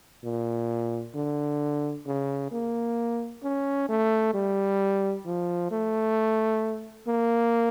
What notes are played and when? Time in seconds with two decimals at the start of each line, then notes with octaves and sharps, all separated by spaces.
0.24 A#2
1.14 D3
2.06 C#3
2.51 A#3
3.43 C#4
3.88 A3
4.34 G3
5.25 F3
5.71 A3
7.07 A#3